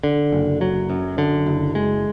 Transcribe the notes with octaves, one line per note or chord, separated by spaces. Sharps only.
D3
F#1
F#3
F#2
D3
F#1
G#3